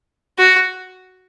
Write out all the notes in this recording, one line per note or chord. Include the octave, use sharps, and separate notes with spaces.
F#4